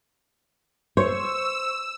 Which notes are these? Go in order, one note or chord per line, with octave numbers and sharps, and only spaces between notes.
C5 C#5 C#6 E6